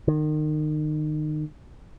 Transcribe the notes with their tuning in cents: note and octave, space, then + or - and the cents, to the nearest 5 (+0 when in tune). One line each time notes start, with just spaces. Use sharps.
D#3 -30